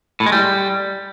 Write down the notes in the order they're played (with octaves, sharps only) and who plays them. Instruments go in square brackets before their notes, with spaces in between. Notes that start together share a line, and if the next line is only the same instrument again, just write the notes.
[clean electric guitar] A2
G#3
G3